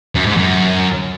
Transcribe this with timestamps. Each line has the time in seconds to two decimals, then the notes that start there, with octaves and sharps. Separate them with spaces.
0.15 F#2
0.26 G#2
0.37 F#2